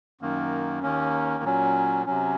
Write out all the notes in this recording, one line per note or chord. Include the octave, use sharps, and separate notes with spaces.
F#2 D#3 A#3
D#2 D#3 A#3 C#4
A#2 F#3 C#4
C3 F#3 C#4